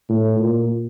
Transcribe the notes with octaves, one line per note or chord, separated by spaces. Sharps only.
A2
A#2